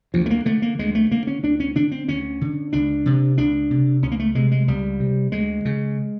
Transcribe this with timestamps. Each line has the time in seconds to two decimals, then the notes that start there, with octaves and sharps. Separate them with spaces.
0.14 D2 F3
0.26 A3
0.30 A#3
0.46 D3 A3
0.62 A#3
0.79 D2 G#3
0.95 A3
1.11 D3 A#3
1.27 C#4
1.43 D2 D4
1.60 C#4
1.75 D3 D4
1.91 C4
2.08 D2 C#4
2.41 D3
2.73 C#2 D4
3.06 C3
3.38 C#2 D4
3.71 C3
4.02 C#2 C#4
4.11 A#3
4.20 A3
4.35 C3 G#3
4.51 G#3
4.68 C#2 G3
5.00 C3
5.32 D2 G#3
5.65 C#3